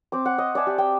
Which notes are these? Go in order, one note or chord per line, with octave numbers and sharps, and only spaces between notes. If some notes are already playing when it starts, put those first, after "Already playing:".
C4 D6
F#5
D#5
D5 E5 G#5 A5
G4
G5